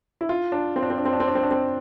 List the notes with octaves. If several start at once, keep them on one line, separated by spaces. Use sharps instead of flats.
E4
F4
D4
C4
D4
C4
D4
C4
D4
C4
D4
C4
D4
C4